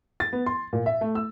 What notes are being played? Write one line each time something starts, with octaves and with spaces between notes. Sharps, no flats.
A6
B3
C6
A#2
E5
A3
E6